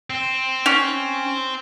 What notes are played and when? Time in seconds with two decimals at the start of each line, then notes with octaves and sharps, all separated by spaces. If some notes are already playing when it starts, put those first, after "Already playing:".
0.10 C4
0.66 C#4